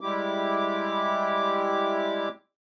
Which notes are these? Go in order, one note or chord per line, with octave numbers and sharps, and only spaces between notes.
G3 G#3 E4 G4 D6